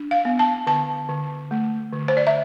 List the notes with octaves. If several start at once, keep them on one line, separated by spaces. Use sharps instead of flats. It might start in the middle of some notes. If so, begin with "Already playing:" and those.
Already playing: D4
F5
B3
A5
D3 A5
D3
A3
D3
C5
D5
E5